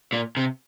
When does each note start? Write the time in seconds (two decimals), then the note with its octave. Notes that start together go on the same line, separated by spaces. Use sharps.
0.13 A#2
0.37 C3